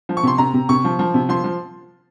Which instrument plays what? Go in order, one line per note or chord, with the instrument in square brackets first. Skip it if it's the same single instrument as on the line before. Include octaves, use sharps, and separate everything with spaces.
[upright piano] F3
C#6
C3 C6
C3 A#5
C3
C3 C#6
F3
F3
C3
F3 C6
F3